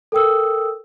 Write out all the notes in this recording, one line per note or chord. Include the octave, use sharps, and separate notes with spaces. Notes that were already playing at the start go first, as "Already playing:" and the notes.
A4 A#4 G5 D#6 E6